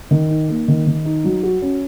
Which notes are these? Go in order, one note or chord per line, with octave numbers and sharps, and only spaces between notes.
D#3
D#4
A#3
D#3
D#3
D#4
F#3
F#4
C#4